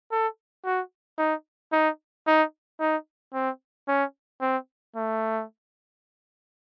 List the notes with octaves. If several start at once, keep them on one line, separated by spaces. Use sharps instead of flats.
A4
F#4
D#4
D#4
D#4
D#4
C4
C#4
C4
A3